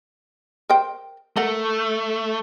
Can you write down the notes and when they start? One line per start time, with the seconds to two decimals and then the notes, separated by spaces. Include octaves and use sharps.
0.70 A#4 C5 G5
1.36 A3 A4 A#4 F#5